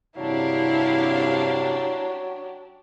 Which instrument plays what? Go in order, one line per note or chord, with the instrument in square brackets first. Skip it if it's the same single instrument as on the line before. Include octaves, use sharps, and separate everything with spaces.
[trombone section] A1 G2 C3 [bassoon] F#3 [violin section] D4 G4 [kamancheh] E4 F5